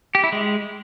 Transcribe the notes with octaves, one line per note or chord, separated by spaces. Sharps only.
G4
E4
G#3